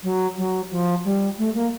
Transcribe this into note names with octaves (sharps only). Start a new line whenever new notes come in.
F#3
F#3
F3
G3
A3
A#3